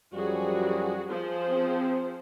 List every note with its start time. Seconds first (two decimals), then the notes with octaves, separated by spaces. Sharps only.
0.13 F#2 F3 G3 F#4 G#4
1.08 F3 G#4 C5
1.48 C4